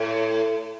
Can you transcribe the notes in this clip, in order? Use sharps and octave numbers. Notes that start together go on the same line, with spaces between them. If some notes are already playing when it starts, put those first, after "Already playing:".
Already playing: A2